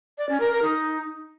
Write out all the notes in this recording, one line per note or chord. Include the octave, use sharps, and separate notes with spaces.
D5
C#4
A#4
A#4
D#4